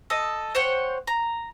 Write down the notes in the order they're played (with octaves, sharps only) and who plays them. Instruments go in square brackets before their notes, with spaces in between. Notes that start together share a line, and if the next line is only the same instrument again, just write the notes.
[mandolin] A4 D#5
C5 C#5 F#5 G5
A#5